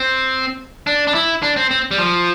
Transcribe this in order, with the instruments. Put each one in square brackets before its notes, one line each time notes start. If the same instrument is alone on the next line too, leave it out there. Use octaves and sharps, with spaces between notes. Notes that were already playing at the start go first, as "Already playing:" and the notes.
Already playing: [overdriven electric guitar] C4
D4
D4
E4
D4
C4
C4
G3
F3